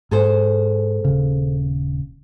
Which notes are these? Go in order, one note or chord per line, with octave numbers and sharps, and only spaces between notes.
G#2 G#4 A4 C5
D#1 C#3